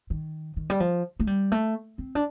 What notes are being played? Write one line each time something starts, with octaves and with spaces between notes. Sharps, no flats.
D#3
D#3
G3
F3
A3
G3
A3
C4
D4